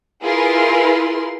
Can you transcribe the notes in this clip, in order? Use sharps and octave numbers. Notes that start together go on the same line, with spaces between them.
E4 F4 G#4 A#4 B4 C6